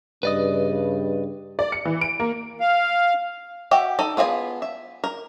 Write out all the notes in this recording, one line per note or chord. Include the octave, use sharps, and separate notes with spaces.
G2 C#3 B4 D5 D#5
D5
C#7
E3
D7
A#3
F5
F#4 G4 E5
D#4 A4
B3 F4 G#4 D#5 G#5
E5
A#4